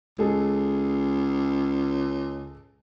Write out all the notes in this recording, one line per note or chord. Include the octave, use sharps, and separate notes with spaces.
C#2 G#3 G#4 A4